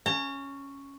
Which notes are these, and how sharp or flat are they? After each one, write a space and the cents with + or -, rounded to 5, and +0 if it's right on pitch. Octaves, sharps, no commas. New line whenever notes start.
C#4 +0 A#5 -45